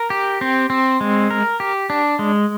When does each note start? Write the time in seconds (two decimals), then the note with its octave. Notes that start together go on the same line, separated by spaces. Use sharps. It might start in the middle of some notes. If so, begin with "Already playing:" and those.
Already playing: A#4
0.10 G4
0.41 C4
0.70 C4
1.01 G#3
1.31 A#4
1.60 G4
1.90 D4
2.19 G#3